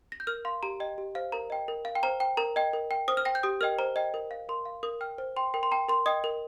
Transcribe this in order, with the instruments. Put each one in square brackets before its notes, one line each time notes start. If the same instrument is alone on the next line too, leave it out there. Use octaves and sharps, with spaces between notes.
[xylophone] A#6
G6
A#4 F6
F5 C6
G4 A#5
D#5 G5
G4
C5 F5
A#4 A#5
D#5 G5
A#4
F5
G5
C5 A#5
G5
A#4 A#5
D#5 G5
A#4
G5
C5 D#6
F6
G5 A#6
G6
G4 D#6
A#4 D#5 G5 F6
C5 A#5
D#5 G5
A#4
F5
A#4 C6
F5
A#4 D#6
G5 F6
C5
G5 C6
A#4 G5
C6
G5 A#5
A#4 C6
D#5 G5 D#6
A#4